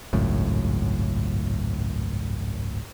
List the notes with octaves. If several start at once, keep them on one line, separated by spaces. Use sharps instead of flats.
G#1 C#2 F#2 A2